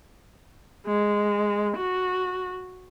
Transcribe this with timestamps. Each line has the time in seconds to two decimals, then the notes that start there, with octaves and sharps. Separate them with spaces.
0.87 G#3
1.77 F#4